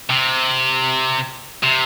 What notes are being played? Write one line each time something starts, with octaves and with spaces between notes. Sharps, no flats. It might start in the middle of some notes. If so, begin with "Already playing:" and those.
C3
C3